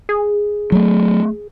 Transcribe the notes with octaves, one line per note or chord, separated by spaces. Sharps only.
G#4
F#3 A3